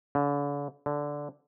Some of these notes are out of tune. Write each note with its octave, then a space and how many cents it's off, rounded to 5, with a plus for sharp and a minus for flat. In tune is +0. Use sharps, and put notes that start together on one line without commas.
D3 -45
D3 -10